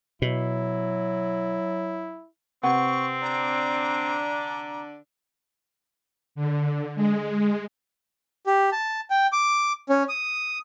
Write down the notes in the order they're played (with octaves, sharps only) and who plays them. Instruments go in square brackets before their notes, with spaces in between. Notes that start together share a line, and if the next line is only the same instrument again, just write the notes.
[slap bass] B2 [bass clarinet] F#3 [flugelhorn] E4
[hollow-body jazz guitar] C3 B4 F#5 [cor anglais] C4 [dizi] C#6
[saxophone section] D3 D4 [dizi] A#5
[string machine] D3
G#3
[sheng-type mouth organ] G4
A5
G5
D6
C#4
D#6